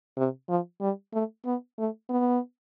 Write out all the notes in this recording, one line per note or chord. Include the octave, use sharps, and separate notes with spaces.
C3
F3
G3
A3
B3
A3
B3